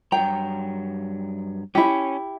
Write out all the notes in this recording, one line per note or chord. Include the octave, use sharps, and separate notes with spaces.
G2 F#3 G5 A#5
C#4 E4 G4